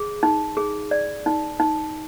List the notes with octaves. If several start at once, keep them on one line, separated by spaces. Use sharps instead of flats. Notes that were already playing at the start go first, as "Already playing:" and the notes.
Already playing: G#4
D#4
G#4
D5
D#4
D#4